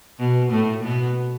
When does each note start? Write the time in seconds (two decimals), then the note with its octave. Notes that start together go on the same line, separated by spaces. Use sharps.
0.19 B2
0.51 A2 A3
0.83 B2 B3